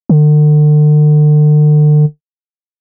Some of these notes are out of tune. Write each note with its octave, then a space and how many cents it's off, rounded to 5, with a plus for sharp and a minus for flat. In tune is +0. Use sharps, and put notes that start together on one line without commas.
D3 +40